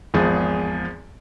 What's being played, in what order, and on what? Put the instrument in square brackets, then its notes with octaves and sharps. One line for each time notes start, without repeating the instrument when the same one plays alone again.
[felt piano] G#1 E2 F3 G#4